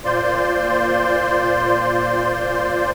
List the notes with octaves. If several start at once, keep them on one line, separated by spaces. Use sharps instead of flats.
A#2 F4 C5 D5 C6